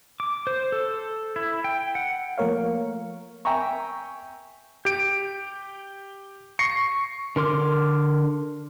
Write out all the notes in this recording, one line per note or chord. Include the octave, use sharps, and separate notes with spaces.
D6
C5
A4
E4
G5
F#5
F3 A3 A#3 A#4 C#5 F5
E5 G5 G#5 A#5 C#6
G4 G6 D7
C#6 A#6 C7 C#7
D3 A#4 C6 D6 F6